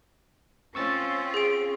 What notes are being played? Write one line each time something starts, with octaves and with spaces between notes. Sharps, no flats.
C4 C#4 F4 C#6 E6 A6
G#4 D7